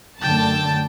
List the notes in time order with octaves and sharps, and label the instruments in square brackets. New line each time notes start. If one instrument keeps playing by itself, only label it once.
[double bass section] F#2 D3 A3 [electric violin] G5 [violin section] A5